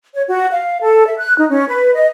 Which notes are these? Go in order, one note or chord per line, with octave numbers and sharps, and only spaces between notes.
C#5
F#4
F5
A4
E5
F#6
D#4
C#4
B4
D#5